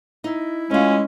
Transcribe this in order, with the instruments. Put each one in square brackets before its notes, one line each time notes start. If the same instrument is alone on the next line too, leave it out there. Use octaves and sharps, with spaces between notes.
[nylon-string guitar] D#4 [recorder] E4
[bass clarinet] G#3 [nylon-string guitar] A3 F4 [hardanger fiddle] C#4